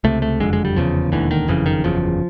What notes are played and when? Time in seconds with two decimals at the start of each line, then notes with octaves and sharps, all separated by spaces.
0.04 C#2 C3 A3
0.22 A3
0.40 F#1 F2 D3 G#3
0.53 G#3
0.65 G3
0.76 F1 E2 C#3 F3
1.12 E1 D#2 D3 E3
1.31 D#3
1.48 F#1 F2 C#3 E3
1.66 D#3
1.84 F#1 E2 C#3 F3